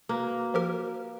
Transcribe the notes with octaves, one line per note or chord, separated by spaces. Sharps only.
A#3 F#4 B4
F3 G4 A#4